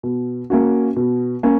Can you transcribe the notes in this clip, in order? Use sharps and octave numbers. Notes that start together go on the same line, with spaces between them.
B2
A#3 C#4 F#4
B2
A#3 C#4